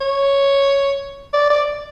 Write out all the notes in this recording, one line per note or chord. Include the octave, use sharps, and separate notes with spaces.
C#5
D5
D5